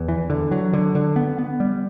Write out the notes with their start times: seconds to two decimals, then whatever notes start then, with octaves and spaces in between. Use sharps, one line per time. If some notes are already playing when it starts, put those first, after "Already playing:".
Already playing: E2
0.08 E3
0.30 D3
0.51 F#3
0.73 D3
0.95 D3
1.16 B3
1.38 B3
1.60 G3